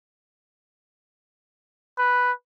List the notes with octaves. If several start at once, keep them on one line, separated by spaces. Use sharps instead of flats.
B4